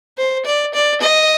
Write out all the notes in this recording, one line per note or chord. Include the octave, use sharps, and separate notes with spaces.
C5
D5
D5
D#5